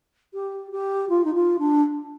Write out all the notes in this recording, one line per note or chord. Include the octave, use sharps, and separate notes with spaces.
G4
G4
F4
D#4
F4
D4